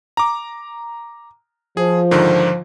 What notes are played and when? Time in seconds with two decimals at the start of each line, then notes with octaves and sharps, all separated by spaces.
0.17 A#5 D6
1.77 F3 G#4
2.11 G#2 D3 D#3